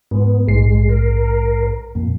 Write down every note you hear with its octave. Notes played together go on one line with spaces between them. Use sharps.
G#2 B3
A#1 G#2 G#3 C7
A#4
F2 A#2